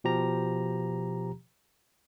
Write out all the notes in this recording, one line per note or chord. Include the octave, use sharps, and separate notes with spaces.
B2 F3 G4 A#5